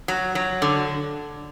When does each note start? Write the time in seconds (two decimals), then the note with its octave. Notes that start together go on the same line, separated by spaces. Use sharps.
0.08 F#3
0.35 F#3
0.62 D3